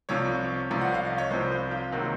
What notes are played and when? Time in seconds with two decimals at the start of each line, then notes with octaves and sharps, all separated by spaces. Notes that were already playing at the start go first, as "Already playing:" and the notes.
0.09 C2 C3 F3 C#5
0.71 C2 C3 F3
0.81 F#5
0.94 F5
1.07 D#5
1.18 C#5
1.31 C2 C3 F3 C5
1.52 C5
1.71 F4
1.92 C#2 C3 D#3 F#3 A#3 F#4